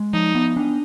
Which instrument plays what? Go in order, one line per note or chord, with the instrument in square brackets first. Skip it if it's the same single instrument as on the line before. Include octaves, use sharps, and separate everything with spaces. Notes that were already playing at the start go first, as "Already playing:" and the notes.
Already playing: [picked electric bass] G#3
[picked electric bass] F3 [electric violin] D#4
[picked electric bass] B3
D4